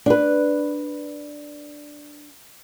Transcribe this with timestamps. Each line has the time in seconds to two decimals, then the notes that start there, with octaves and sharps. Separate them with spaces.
0.06 D4 B4